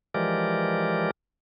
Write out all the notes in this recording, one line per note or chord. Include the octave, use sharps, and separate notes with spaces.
E3 F3 G#3 G4 A#4 D5